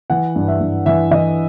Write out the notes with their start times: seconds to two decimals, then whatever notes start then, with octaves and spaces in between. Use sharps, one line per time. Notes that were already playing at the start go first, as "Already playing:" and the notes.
0.10 E3 F#5
0.36 G2
0.48 E5
0.60 G2
0.86 E3 E5
1.11 E3 D#5